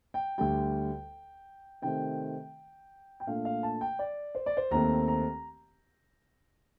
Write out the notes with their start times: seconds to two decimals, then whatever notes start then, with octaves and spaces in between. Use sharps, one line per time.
0.14 G5
0.38 D2 D3 G3 G5
1.82 C3 D#3 A3 C4 G5
3.20 G5
3.27 A#2 A3 D4 F5
3.45 F5
3.63 A5
3.81 G5
3.99 D5
4.35 C5
4.46 D5
4.57 C5
4.71 D#2 D#3 A3 C4 A#5
5.08 A#5